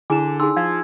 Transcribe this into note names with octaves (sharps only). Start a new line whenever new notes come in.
D3 E4 G#4 G#5 D6 E7
D#4 G#4 G#5 C6 E6
F3 F5 G#6